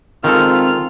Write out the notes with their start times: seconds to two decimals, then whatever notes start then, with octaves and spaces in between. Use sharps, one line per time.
0.24 D#3 G#3 C4 F4 A4 F6